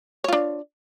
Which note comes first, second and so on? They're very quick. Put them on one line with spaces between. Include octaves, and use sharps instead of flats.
C#5 F4 D4